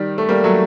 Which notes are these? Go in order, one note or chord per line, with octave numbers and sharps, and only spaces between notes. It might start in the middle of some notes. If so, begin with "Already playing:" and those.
Already playing: D#3 G3
A3
G3 A#3
F#3 A3